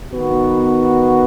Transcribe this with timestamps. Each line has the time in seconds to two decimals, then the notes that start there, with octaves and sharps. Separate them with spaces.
0.12 D#3 B3 F#4